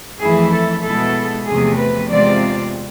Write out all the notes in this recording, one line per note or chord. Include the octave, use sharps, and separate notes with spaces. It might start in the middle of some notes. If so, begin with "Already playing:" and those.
F2 E3 A3 E4 G#4
A4
B2 G#3 B3 E4 A4
E2 C3 F3 A3 G#4
B4
E2 C3 G#3 C4 F4 D5